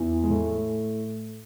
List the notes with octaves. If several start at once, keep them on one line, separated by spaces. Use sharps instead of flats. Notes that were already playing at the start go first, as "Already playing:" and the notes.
Already playing: E2 E3
G#3
A2 A3